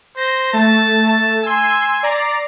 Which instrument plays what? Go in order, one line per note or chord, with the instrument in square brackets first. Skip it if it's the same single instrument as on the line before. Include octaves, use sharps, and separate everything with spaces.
[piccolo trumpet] C5 [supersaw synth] A#6
[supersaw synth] A3 [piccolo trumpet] A5
[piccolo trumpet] A5
[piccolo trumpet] G#5 [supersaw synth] C6 E6
[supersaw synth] D5 A#5 C7